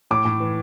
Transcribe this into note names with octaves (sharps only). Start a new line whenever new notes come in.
A2 D6
A2
E3